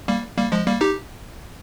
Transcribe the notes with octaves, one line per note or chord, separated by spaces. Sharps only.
G3 A#3
G3 A#3
F3 G#3
G3 A#3
D#4 G4